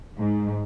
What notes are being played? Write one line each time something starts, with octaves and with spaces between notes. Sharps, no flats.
G#2